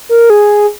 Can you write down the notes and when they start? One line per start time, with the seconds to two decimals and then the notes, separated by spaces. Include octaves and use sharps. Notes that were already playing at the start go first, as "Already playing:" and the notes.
0.09 A#4
0.30 G#4